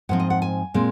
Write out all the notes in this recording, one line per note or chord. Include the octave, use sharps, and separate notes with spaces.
G#2 F3 C4 F#5
D#5
F#5
G#5
A#2 G#3 C4